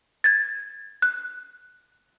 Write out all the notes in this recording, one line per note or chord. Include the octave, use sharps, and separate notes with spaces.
G#6 A6
F#6